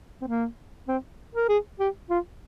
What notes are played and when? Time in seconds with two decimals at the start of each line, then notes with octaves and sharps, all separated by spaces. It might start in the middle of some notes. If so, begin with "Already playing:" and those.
0.21 C4
0.27 A#3
0.88 C4
1.35 A#4
1.48 G#4
1.79 G4
2.10 F4